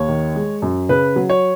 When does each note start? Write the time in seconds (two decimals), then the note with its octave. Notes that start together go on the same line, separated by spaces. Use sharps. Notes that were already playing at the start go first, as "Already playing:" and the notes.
Already playing: D#2 C#5
0.08 D#3
0.36 G#3
0.62 F#2
0.89 C#3 B4
1.16 F#3
1.30 C#5